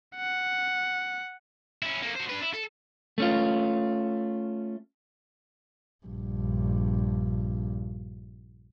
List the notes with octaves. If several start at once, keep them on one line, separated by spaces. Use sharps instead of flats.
F#5
C#4 E4
A#3 A4
F#4 C5
D4 B4
E4
A4
A3 C#4 F4
A#1 G2